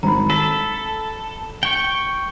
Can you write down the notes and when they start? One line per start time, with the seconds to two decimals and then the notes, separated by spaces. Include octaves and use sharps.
0.03 G#1 A#5 B5
0.30 A4 B6
1.63 G5 C#6